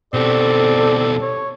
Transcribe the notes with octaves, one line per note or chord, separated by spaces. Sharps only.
B2 G3 C4 A4 D5
C#5